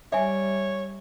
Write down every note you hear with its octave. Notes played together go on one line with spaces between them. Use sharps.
G3 C#5 E5 G#5